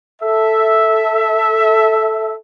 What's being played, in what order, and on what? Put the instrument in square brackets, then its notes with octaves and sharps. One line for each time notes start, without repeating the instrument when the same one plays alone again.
[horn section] A4 E5